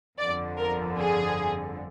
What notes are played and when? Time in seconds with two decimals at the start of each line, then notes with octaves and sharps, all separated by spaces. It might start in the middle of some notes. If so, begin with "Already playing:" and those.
0.18 G1 F2 D3 F3 D5
0.59 A#4
1.00 G#4